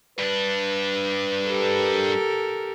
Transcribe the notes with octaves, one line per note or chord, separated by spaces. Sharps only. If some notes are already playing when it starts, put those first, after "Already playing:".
G2 D4 B4
G4 A4 A#4